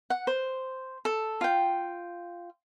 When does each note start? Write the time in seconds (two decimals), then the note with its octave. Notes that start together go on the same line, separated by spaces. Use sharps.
0.10 F#5
0.27 C5
1.05 A4
1.41 F4 G5